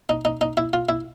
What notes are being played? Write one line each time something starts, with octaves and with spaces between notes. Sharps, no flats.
D#4
D#4
D#4
E4
F4
E4